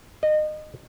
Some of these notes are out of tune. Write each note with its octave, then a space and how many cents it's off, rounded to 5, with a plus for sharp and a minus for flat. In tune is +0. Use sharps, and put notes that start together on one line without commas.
D#5 -25